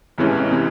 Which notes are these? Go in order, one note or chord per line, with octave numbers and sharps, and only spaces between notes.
A1 A2 C3 E3 G#3 C#4
C3